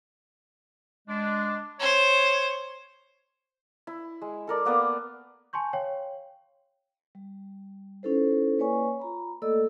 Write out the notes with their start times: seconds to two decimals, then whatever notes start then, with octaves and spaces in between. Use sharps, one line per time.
1.08 G#3 D4
1.80 C5 C#5
3.87 E4
4.22 G#3
4.47 A4 A#4 D5
4.65 A#3 B3 D5 F5
5.53 G#5 A5 C6 C#6 G6
5.73 C#5 F5 G5
7.15 G3
8.03 C#4 D#4 E4 A4 B4 C5
8.58 A#3 B4 C#5 D5 G#5 C#6
8.99 F4 A#5 B5
9.42 A3 A#3 A4 D5 D#5 E6